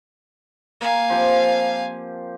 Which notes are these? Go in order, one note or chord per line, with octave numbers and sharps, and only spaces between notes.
A#3 F5 G#5
F3 C4 G4